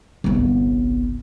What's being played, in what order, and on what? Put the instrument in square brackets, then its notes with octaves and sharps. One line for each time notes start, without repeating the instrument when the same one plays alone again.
[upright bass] G1 C2